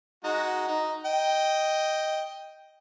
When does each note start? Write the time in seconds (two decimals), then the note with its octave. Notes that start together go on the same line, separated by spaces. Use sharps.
0.24 G#3 D#4 F#4
0.68 D#4
1.05 D#5 G5